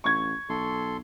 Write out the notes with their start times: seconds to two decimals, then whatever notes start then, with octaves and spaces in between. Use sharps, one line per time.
0.04 A1 C#6 G#6
0.50 B1 A4 C6